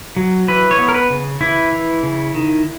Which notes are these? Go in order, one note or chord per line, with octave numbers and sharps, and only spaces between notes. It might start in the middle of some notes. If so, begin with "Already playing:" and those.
F#3
E3 B4
C#5
B3
A#4
B4
C#3
E3 E4
E3
C#3
D#3